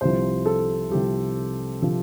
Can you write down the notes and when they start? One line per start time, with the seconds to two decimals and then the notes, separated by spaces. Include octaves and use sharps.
0.01 C2 C3 F3 C5
0.45 A4
0.90 C2 C3 F3 G4
1.82 C3 F3